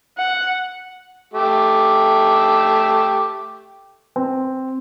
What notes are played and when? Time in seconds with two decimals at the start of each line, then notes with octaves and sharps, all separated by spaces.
0.18 F#5
1.33 A3 G4
4.16 C4